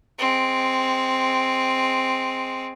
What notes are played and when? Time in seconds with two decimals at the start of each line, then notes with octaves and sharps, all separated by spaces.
0.19 G#3 C4